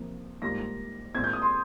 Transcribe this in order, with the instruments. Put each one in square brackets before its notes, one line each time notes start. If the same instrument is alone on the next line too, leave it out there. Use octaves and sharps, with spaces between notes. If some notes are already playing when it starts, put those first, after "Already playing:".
Already playing: [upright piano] C3 F3 A#3
[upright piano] G#2 G3 A#3 F4 [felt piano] A#6
[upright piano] A#2 G#3 C4 [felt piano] G#6
[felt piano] G6
D#6
C6